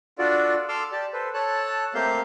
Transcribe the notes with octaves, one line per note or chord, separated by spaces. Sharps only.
D4 F4 F#4 A4 D5
A4 C6 D6 E6 F6
G4 D5 A5
A4 B4 C5
A4 C#5 A5 F#6
A3 A#3 C4 G4 F5 G6